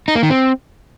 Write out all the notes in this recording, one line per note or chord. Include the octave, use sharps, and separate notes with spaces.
D#4
A#3
D#3
C4